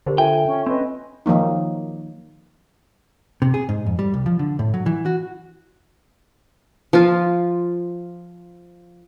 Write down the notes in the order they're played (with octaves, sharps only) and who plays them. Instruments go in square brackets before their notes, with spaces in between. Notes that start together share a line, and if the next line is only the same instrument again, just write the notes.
[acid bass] D3 [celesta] G4 A#4 C5
[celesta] F4 A4 E5 [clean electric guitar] G5 [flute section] G#5
[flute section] C#4
[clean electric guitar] C4 [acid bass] C#4 [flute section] B4 D#5 G#5
[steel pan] D#3 F3 F#3 A#3 D#4
[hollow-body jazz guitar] C3
G#4
G#2
F2
G3
C2
F3
D3
A2
F#3
E3
F#4
[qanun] F3 F4